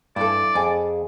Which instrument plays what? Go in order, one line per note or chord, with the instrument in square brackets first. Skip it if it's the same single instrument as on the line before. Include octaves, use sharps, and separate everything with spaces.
[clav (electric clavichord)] G2 [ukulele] E4 A4 [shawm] D5
[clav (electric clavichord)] F2 [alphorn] G#4 [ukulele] G#5